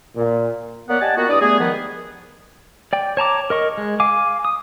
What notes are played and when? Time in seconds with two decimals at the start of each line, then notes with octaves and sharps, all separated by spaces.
0.16 A#2
0.89 A#3 B3 C#5 D5 F#5
1.01 G4 D5 D#5 F#5 G#5 A5
1.16 A#3 B3 F4 F#4
1.29 G2 D4 E4 D5 D#6
1.41 G3 A3 B3 G#4
1.59 D#3 F3 G#3 B3
2.93 D5 G5
3.17 C#5 A5 A#5 D6
3.50 A#4 D#5 C#6
3.77 G#3
4.00 F5 G#5 D6
4.45 D#6